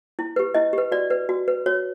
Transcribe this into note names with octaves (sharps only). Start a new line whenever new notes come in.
E4
G4 B4
E4 D#5
G4 B4
F#4 D5
B4
F#4
B4
F#4 C#5